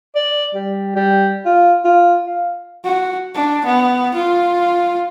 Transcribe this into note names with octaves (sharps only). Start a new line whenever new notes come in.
D5
G3
G3
F4
F4
F5
F#4
D4
B3
F4